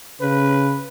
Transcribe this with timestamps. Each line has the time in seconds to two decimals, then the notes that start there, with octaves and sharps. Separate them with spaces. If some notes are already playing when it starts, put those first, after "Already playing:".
0.21 C#3 B4